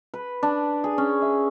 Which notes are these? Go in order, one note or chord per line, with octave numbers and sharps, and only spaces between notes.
B4
D4
G#4
C#4
E5